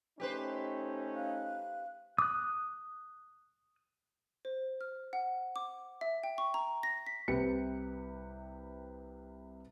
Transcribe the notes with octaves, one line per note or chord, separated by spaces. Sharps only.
A3 C#4 D#4 G4 B4 C5
F5 F#6
D6 D#6 F#6
C5
F6
F#5
D6
E5
G5
C#6
A#5
A#6
B6
C2 C3 G4 B4 C#7